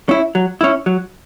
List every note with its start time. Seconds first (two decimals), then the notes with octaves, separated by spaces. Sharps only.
0.09 C#4 E4
0.35 F#3
0.61 C#4 E4
0.86 F#3